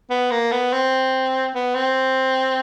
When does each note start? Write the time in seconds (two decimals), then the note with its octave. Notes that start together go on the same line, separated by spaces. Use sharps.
0.10 B3
0.31 A#3
0.52 B3
0.73 C4
1.55 B3
1.75 C4